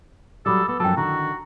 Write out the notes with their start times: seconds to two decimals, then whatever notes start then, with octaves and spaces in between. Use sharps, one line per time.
0.46 F#3 G3 A4 B5 D6 D#6
0.68 B3 A4
0.80 F#2 F3 F#3 A4 G5 A5
0.97 D3 D#3 F#4 A#5